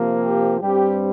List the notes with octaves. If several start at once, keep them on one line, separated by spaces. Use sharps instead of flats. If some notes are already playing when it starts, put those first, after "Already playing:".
Already playing: C3 F3 A#3
G4
G2 G3 C4 G4